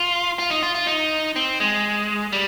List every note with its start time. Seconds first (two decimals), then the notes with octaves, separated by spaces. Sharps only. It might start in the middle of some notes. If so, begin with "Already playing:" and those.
Already playing: F4
0.39 F4
0.50 D#4
0.63 F4
0.75 F4
0.87 D#4
1.36 C4
1.60 G#3
2.32 G3